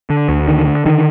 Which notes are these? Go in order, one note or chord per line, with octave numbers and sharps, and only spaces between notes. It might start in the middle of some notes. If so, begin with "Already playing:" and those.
D3
D2
D3 D#3
D3
D3 D#3